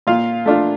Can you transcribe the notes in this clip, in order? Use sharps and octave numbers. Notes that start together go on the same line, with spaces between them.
A#2 F4 F5
A3 D4 F4